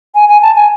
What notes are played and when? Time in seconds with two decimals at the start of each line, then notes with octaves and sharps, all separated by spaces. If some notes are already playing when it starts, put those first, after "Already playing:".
0.15 G#5
0.29 G#5
0.42 A5
0.56 G#5